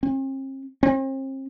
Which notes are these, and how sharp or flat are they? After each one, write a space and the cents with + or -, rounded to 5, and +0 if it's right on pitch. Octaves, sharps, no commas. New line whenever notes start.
C4 +45
C4 +40